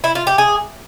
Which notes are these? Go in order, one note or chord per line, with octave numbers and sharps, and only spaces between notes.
E4
F4
G4
G#4